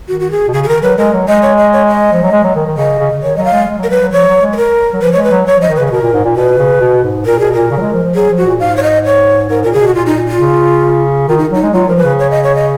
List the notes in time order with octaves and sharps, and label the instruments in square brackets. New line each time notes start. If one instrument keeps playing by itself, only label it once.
[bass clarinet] D#3 [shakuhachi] F#4
[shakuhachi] F#4
G#4
[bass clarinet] B2
[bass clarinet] C#3 [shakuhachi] G#4
[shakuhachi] G#4
[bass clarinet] D#3 [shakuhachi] A#4
[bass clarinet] F#3 [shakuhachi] B4
[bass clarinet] G#3 [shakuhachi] A#4
[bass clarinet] F#3
[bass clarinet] G#3 [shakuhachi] D#5
[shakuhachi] C#5
D#5
C#5
D#5
[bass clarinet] F3
F#3
G#3
F#3
D#3
D#3
[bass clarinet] C#3 [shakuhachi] D#5
[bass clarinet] C#3
C#3
[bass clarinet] D#3 [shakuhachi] C#5
[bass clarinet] F#3 [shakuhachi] D#5
[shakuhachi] F5
[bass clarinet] G#3
G#3
F#3
[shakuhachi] A#4
[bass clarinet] F#3 [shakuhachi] B4
[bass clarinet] F#3
[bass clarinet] F3 [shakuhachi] C#5
[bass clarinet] F#3
G#3
[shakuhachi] B4
A#4
[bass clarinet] F#3
[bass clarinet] F3 [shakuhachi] B4
[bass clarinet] G#3 [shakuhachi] C#5
[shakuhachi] B4
[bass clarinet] F#3
[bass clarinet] F#3 [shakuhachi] C#5
[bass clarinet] F3 [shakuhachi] D#5
[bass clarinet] D#3
[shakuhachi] B4
[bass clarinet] C#3
[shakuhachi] B4
[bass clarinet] B2 [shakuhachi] A#4
[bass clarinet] A#2
G#2
A#2
[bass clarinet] B2 [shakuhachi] B4
[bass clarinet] C#3
B2
G#2
[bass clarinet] A#2 [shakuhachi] A#4
[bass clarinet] B2 [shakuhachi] G#4
[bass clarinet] A#2 [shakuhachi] A#4
[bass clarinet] C#3
F#3
G#3
F3
F3
[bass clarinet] F#3 [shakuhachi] G#4
[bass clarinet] F3
[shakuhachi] F#4
[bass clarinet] A#2
[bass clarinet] G#2 [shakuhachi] F5
[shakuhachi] C#5
D#5
C#5
[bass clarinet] G#2 [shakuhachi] A#4
[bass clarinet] A#2 [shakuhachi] A#4
[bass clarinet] C#3 [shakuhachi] G#4
[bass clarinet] B2
[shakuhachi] F#4
[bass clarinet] A#2 [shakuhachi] F4
[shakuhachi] D#4
[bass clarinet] A#2
[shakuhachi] F4
[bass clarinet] C#3
[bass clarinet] D#3 [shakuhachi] F4
[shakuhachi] D#4
[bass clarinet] F#3 [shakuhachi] D#4
[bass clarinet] G#3
[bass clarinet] F#3 [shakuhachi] F4
[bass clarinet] F3 [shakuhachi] A#4
[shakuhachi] B4
[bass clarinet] C#3
[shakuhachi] C#5
D#5
C#5
D#5